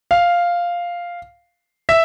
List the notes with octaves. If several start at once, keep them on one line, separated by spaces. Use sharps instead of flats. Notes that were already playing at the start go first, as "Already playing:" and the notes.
F5
E5